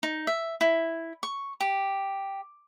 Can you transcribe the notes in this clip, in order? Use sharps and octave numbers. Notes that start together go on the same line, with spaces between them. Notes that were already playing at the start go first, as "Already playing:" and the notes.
D#4
E5
E4
C#6
G4